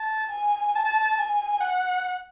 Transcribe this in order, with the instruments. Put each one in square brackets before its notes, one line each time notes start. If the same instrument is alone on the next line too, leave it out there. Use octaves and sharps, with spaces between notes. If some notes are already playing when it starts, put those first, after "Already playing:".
Already playing: [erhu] A5
G#5
A5
G#5
F#5